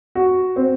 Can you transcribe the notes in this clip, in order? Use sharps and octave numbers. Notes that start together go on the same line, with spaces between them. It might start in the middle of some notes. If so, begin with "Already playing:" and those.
F#4
C4